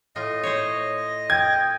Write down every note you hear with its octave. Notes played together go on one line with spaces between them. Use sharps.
A2 F4 D#5
C5 C#5
G5 G#6